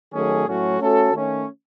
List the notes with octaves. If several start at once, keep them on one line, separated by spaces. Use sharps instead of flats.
D#3 F#3 A3 C#4 G#4
A2 F#3 A3 C#4 F#4
A3 C#4 F#4 A4
D#3 A3 C#4